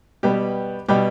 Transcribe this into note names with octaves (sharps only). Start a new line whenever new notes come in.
B2 G3 B3 G4 B4
B2 G3 B3 G4 B4